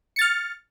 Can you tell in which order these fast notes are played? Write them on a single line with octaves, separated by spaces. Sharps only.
C#7 A6 F6